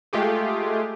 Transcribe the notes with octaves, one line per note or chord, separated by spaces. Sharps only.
G#3 A3 F4 G4 G#4